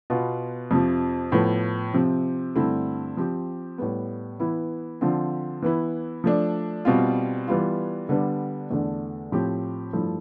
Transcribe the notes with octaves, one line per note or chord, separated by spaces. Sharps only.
B2 B3 F4
F2 C3 F3
A2 F3 B3
C3 F3 C4
G2 D3 A3 C4 E4
F3 C4 G4
A2 G3 B3
E3 B3 E4
D3 F3 C4 F4
E3 B3 E4
F3 A3 D4
B2 G3 C4 F4
E3 G3 B3 F4
D3 G3 B3 D4
E2 D3 A3 D4
A2 F3 C4 G4
G2 F3 A3 E4